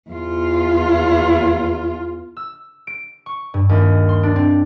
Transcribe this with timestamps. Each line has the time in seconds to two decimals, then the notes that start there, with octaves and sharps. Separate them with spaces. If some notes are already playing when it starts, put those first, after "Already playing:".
0.10 E2 F4
2.37 E6
2.87 D7
3.26 C#6
3.54 G2
3.69 D#2
4.09 C6
4.23 D4
4.36 C4